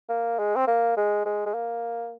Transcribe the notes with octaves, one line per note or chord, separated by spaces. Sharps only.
A#3
G#3
C4
A#3
G#3
G#3
G#3
A#3